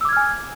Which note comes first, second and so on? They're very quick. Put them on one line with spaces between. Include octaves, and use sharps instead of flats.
E6 D6 G#6 F6 G#5